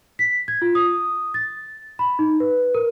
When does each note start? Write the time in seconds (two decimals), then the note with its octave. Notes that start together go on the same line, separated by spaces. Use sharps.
0.19 B6
0.48 G#6
0.62 F4
0.75 D#6
1.34 A6
1.99 B5
2.19 D#4
2.40 B4
2.74 A#4